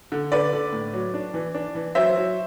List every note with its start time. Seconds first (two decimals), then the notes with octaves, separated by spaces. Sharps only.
0.12 D3
0.32 D3 B4 D5
0.53 D3
0.73 A2
0.93 F#3
1.14 D4
1.34 E3
1.54 D4
1.75 E3
1.95 F#3 C5 E5
2.16 F#3